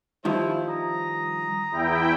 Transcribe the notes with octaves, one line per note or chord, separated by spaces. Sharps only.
G2 D#3 F3 E4 C5
A#5 D#6
E2 E4 G5